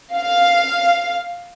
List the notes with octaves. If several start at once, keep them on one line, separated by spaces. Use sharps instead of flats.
F5